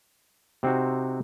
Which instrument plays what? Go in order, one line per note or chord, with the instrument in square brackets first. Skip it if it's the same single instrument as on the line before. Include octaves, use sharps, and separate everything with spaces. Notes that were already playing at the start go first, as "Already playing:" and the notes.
[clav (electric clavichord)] C3 C4 D#4 F#4